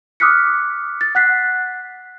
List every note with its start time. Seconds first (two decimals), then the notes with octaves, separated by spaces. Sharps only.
0.20 D6 D#6 F6 F#6 B6 C#7
1.01 A6
1.15 F#5 F#6 B6 C7